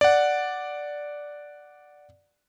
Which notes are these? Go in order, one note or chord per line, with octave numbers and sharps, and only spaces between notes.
D5 F#5